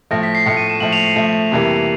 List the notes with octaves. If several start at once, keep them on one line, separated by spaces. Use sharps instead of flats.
A2 F3 A3 A#6
B6
C7
A2 F3 A3 C#7
D#7
E7
A2 F3 A3 F#7
F7
C7
A2 F3 A3
F2 C3 E3 G3 A#3